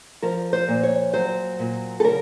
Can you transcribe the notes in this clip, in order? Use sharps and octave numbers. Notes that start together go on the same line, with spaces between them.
F3 A#4
C5
A#2
C#5
F#3 C5
A#2
A4
C#3 A#4